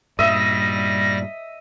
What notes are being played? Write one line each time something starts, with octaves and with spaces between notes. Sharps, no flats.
G2 A#2 G3 D#5 E5 A#6